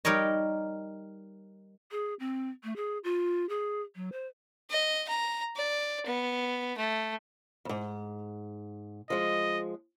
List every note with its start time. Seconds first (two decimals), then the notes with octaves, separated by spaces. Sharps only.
0.05 G3 D#4 A#4 C#5 D#5
1.91 G#4
2.20 C4
2.64 A3
2.76 G#4
3.04 F4
3.49 G#4
3.96 F#3
4.12 C5
4.70 D#5
5.08 A#5
5.56 D5
6.06 B3
6.77 A3
7.65 F2 G#2
9.10 F3 G#3 D#5